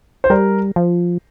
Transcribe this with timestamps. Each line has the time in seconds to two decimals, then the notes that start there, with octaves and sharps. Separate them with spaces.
0.24 C5
0.30 G3 A#4
0.76 F3